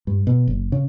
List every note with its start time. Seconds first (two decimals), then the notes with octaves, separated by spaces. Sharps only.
0.07 G2
0.27 B2
0.47 F#1
0.72 C#3